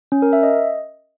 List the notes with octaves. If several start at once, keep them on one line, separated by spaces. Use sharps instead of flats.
C#4
A#4
E5
D#5